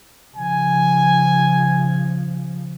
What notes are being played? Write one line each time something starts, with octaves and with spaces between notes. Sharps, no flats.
C#3 F3 G#5